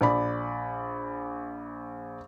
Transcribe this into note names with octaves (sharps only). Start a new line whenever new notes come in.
A#1 D5 B5